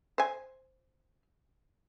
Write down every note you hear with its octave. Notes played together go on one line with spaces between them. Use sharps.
C5 G#5